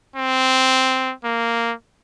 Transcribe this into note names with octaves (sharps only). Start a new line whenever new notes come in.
C4
A#3